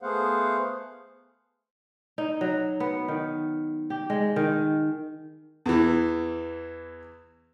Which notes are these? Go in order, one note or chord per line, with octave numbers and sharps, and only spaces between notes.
A3 B3 G#4 C5 F5 F#5
D#4
F#3
B3
D#3
G4
G#3
D#3
E2 E3